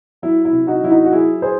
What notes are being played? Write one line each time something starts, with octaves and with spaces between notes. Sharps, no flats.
F#3 E4
E4
C2
D#4 F#4
F#3 E4
D#4 F#4
F#4
F#3 E4 G#4
G#4 C5